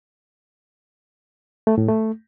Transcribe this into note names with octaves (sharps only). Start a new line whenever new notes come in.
A3
A2
A3